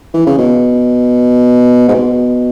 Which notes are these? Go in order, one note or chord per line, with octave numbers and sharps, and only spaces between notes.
E3
C#3
B2
G#2
B2